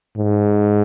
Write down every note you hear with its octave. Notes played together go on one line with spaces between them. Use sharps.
G#2